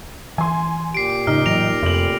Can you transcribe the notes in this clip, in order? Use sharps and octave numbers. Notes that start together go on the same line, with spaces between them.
E3 G#5 C6
A#2 G4 C7 D7
A2 C#3 D#4 F6
A2 E3 F#3 A#6 D7 F7
F1 F2 F#7